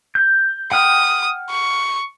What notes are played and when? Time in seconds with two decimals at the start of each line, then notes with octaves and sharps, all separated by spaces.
0.15 G6
0.72 F#5 G5 D#6 F6
1.50 C#6